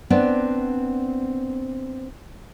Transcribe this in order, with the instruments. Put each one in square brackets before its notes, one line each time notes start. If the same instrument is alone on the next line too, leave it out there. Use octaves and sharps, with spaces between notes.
[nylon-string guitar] B3 C4 D4